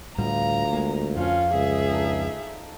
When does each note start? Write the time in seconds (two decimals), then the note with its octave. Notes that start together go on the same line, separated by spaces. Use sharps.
0.18 D2 A2 G3 B3 F4 D#5 A#5
0.73 G#3 A#3 A#4 G#5
1.16 F2 C#4 F4 A4 C5 F5
1.54 C#2 G#4 E5
1.90 D4 D#4 A4